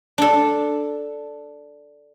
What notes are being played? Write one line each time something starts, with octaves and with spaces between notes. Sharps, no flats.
D4 A4